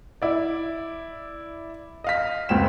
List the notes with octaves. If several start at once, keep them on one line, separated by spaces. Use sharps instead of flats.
E4 D5
D#5 F5 B6
F1 C#2 C4 G5 E7